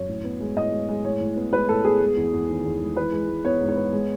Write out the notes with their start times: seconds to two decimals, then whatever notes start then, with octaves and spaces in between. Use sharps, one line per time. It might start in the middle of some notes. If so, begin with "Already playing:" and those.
Already playing: F#2 C#5
0.08 A2
0.24 B3
0.40 G#3
0.56 A2 D#5
0.72 G#3
0.89 G#3
1.04 A2 C#5
1.20 A2
1.36 B3
1.53 G#3 B4
1.68 A2 A4
1.84 B3 G#4
2.00 G#3
2.17 E2
2.33 E2
2.49 D#3
2.65 E2
2.81 G#3
2.96 E3 B4
3.12 G#3
3.29 G#3
3.45 B3 C#5
3.60 G#2
3.69 C#5
3.76 B3
3.93 G#3